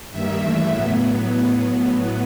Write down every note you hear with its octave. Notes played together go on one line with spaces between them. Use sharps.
G2 D#3 G3 A#3 E5
C#3 E3 A3
A2 F#3 B3